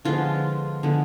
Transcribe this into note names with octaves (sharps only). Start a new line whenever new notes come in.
D3 F3 G#3 B3 F4
D3 F3 G#3 B3